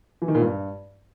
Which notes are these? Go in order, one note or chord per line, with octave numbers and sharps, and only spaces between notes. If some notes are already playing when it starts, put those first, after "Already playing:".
E3
D#3
A#2
G2